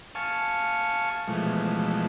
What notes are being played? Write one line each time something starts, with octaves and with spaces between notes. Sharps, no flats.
F5 G#5 A5 C#6
B2 E3 F3 G#3 A3